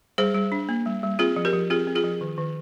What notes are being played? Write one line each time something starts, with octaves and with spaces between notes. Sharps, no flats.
G3 G#4 C5
G3
D4
A#3
G3
G3
C4 F4 G#4
F3
G4 A#4
F3
C4 F4 G#4
C4
F4 G#4
F3
D#3
D#3